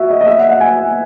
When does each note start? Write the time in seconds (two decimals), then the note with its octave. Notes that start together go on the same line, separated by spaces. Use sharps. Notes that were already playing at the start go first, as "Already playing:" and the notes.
Already playing: F#4 E5
0.10 D#5
0.21 D#5
0.26 E5
0.38 F#5
0.49 F#5
0.60 G#5